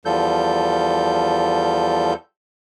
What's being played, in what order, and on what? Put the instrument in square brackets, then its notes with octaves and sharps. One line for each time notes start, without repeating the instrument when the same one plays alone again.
[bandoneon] E2 F3 G3 A4 G6